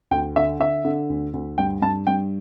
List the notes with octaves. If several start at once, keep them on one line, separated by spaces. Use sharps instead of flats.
D2 G5
D3 E5
D3 E5
D3
D2
D2
G2 G5
G2 A5
G2 G5